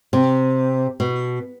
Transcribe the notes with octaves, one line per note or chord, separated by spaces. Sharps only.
C3
B2